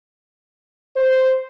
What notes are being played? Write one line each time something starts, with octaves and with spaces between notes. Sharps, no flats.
C5